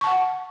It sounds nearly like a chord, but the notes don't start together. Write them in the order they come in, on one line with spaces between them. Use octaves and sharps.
C#6 A5 F#5